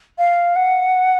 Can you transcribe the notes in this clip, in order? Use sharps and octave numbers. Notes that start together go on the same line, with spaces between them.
F5
F#5